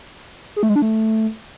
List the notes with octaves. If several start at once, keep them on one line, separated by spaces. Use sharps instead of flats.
G#4
A3
G#3
D4
A3